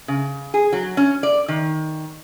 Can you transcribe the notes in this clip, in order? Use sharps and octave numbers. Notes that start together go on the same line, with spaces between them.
C#3
G#4
F#3
C#4
D5
D#3